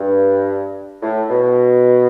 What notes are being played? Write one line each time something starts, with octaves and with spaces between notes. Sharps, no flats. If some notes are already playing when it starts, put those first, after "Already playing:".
Already playing: G2
A2
B2